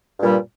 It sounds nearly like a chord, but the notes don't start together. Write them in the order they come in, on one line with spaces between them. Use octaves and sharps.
G2 A#2 G3